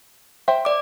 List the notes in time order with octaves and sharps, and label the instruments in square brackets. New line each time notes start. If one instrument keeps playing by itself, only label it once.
[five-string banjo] C5 E5 G5
[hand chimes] D5 D6